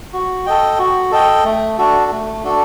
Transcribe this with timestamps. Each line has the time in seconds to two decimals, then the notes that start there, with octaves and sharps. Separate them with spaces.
0.13 F#4
0.46 A4 D#5 G5
0.79 F#4
1.11 A4 D#5 G5
1.44 A3
1.78 D4 F#4 A4
2.11 A3
2.43 D4 F#4 A4